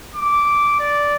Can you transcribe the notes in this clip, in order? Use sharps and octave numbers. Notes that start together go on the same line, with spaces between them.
D6
D5